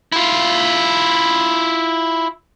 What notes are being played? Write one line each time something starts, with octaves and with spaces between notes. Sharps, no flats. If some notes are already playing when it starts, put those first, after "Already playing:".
E4 F4